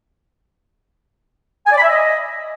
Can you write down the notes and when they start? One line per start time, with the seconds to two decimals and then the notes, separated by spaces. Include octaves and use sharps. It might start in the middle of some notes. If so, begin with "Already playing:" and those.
1.67 G#5
1.72 D5
1.78 B5
1.83 E5
1.89 D#5